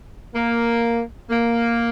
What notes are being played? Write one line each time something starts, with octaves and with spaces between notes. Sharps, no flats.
A#3
A#3